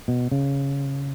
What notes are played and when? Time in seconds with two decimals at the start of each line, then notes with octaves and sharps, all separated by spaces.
0.08 B2
0.32 C#3